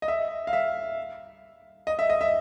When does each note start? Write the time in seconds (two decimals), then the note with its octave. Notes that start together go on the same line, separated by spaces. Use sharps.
0.02 D#5
0.08 E5
0.47 F5
0.53 E5
1.87 D#5
1.99 E5
2.09 D#5
2.21 E5